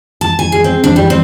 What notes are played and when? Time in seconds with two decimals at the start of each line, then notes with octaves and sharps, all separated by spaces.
0.21 A5
0.39 G#5
0.52 G#4
0.64 C4
0.84 D4
0.96 G3
1.10 C4